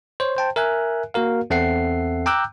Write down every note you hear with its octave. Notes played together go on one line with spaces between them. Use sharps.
C5 C#5
C5 G5 A5
A#4 E5 G#5 F#6
A#3 F#4 A#4 F5
E2 C4 A4 E5 F#5 C7
G5 A#5 D6 E6 F#6 G6